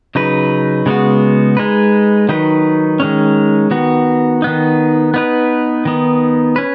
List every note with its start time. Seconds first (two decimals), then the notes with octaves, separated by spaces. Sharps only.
0.15 C#3 F#3 D#4 B4
0.86 C#3 G#3 B3 F#4
1.57 G#3 D#4 B4
2.29 D#3 F#3 D#4 B4
3.00 D#3 G#3 C#4
3.71 D#3 B3 F#4
4.42 D#3 B3 D#4
5.14 B3 D#4 B4
5.85 D#3 B3 D#4
6.56 C#4 B4